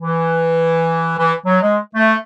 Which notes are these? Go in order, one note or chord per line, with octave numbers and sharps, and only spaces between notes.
E3
E3
F#3
G#3
A3